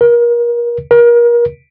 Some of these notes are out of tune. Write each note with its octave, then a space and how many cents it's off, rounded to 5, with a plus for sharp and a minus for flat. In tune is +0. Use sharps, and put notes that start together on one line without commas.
A#4 +30
A#4 +30